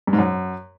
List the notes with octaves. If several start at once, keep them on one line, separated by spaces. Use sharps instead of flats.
G2
G#2
F#2